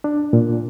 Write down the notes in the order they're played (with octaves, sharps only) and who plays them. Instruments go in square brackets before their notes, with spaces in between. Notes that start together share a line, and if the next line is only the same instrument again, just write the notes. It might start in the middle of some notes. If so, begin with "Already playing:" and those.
[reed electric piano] D4
A#2